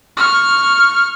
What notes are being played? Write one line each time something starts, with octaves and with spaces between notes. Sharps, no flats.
C#6 F6